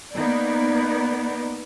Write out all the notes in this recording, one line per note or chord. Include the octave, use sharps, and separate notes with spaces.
A#3 B3 D#4 D5